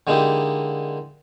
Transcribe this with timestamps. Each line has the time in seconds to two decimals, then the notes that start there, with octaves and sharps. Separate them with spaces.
0.07 D3 G#3 A#3 D#4 E4 G4